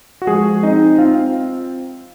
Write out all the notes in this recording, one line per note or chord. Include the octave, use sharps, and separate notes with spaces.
F#4
F3 G#3 G#4
C4 D#4 D#5
C4 F4 F5